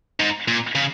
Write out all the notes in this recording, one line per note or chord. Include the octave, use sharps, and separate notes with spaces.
G#2
A#2
C#3